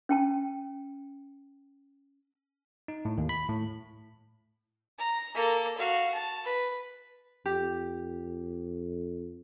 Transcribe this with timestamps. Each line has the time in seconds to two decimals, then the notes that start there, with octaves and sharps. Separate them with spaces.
0.09 C#4 G5 A5
2.88 D#4
3.05 A2
3.18 D#2
3.29 B5
3.49 A2
4.98 A#5
5.34 A#3 A4
5.78 F#4 F5
6.14 A5
6.44 B4
7.46 F2 G4